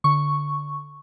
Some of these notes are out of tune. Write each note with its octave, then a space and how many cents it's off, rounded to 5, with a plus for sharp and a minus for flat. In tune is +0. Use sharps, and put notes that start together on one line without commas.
D3 +0 C#6 +0